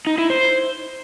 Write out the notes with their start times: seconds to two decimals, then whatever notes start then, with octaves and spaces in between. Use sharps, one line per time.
0.07 D#4
0.18 E4
0.30 C5